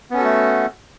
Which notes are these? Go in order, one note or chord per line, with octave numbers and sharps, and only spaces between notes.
A3 B3 C#4 F#4 A4